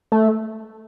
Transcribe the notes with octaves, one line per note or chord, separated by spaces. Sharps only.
A3